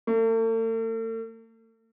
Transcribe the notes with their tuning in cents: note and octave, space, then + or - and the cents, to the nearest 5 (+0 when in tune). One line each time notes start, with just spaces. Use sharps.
A3 +45